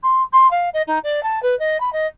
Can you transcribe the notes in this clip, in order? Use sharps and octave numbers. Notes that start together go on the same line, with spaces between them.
C6
C6
F5
D#5
D#4
D5
A5
B4
D#5
B5
D#5